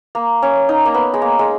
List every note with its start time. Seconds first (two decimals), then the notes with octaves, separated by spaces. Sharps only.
0.15 A#3
0.42 C#4
0.69 D#4
0.86 A#3
0.94 B3
1.14 G#3
1.22 A#3
1.39 G#3